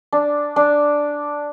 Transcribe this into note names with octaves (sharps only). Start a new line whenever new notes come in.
D4
D4